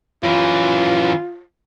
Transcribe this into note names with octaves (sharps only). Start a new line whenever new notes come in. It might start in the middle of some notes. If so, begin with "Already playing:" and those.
F#2 E3 F4